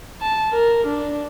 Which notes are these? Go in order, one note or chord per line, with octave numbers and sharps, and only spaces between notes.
A5
A#4
D4